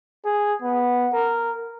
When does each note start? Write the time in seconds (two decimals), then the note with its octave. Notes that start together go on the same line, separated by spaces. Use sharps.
0.25 G#4
0.62 B3
1.13 A#4